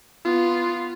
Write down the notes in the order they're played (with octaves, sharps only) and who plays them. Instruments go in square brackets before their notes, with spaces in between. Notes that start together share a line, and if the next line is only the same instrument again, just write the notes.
[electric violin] B3 F4